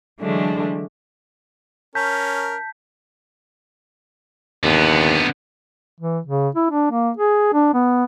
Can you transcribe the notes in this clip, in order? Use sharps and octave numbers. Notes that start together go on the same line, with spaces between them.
D3 E3 F#3 G#3 A3 D4
C#4 A#4 A5 G6 B6
D#2 D3 B3
E3
C#3
E4
D4
A#3
G#4
D4
B3